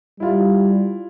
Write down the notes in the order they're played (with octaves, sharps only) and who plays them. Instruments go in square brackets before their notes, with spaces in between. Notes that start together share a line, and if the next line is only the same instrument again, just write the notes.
[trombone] G3 [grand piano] E4 F4